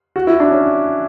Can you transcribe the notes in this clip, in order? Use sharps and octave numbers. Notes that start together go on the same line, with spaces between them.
F#4
E4
D4
C#4